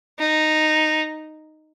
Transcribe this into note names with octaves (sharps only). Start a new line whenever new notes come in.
D#4